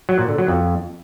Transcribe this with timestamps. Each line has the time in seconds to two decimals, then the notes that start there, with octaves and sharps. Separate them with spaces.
0.09 F#3
0.19 A#2
0.29 D3
0.38 F#3
0.48 F2